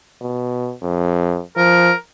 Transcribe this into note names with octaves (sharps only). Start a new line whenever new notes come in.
B2
F2
F3 A#4